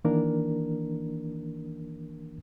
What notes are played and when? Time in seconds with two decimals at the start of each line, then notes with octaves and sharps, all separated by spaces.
0.05 D#3 E3 A#3 D4 A#4